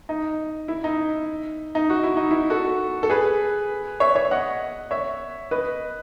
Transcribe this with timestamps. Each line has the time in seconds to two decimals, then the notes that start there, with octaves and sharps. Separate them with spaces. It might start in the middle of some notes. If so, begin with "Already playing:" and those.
0.09 D#4
0.68 E4
0.84 D#4
1.75 D#4
1.90 F#4
2.03 E4
2.17 D#4
2.31 E4
2.50 F#4 A4
3.03 A4
3.10 G#4 B4
4.00 C#5 E5
4.15 C#5 E5
4.31 D#5 F#5
4.91 C#5 E5
5.51 B4 D#5